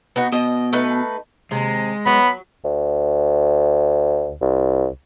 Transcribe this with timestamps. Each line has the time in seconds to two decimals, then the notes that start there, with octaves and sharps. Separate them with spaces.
0.16 B3 D#4 F#4
0.32 B2 D#5
0.73 A3 D#4 B4
1.51 D#2 C3 G#3
2.06 F#3 B3 B5
2.64 D2
4.42 C2